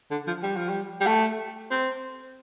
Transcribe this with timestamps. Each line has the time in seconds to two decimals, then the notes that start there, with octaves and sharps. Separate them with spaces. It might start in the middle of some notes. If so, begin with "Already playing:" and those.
0.11 D3
0.27 F3
0.43 G3
0.56 F3
0.69 G3
1.01 G3
1.07 A3
1.71 C4